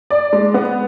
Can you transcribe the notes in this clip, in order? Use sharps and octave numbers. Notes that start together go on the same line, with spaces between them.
D5
G#3
B3